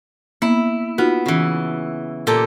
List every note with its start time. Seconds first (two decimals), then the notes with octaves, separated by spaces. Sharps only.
0.42 A#3 B3 E4
0.98 B3 D#4 F4 F#4
1.26 C#3 E3
2.27 A#2 G4 A4